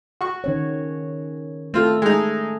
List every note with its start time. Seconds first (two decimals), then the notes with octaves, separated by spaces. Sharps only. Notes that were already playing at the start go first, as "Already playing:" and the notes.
0.21 F#4 C#6
0.44 D#3 C#4 C#5
1.74 A3 C4 F4 A4
2.02 G#3 D#4